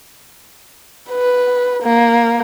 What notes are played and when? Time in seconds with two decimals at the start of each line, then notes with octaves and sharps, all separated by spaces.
1.11 B4
1.83 A#3